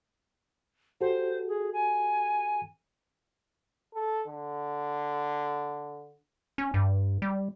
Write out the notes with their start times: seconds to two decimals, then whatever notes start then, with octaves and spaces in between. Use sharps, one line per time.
1.01 F#4 G4 A4 C5
1.48 G#4
1.73 G#5
3.94 A4
4.28 D3
6.58 C#4
6.74 G2
7.22 G3